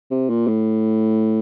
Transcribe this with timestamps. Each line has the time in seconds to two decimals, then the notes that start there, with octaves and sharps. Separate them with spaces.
0.11 C3
0.29 A#2
0.47 A2